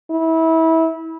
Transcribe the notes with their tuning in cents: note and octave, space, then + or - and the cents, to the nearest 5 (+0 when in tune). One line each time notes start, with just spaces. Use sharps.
E4 -25